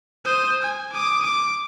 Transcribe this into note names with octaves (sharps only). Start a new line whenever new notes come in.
C5 D#6
G#5
D6 D#6
D6